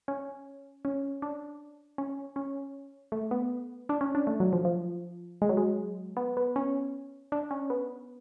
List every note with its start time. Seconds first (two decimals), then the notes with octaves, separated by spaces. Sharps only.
0.08 C#4
0.85 C#4
1.22 D4
1.98 C#4
2.36 C#4
3.12 A3
3.31 B3
3.89 D4
4.01 C#4
4.15 D4
4.27 A3
4.40 F#3
4.53 F3
4.65 F3
5.42 G#3
5.49 F#3
5.57 G#3
6.17 B3
6.37 B3
6.56 C#4
7.32 D4
7.51 C#4
7.70 B3